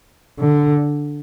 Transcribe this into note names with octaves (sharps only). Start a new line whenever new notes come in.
D3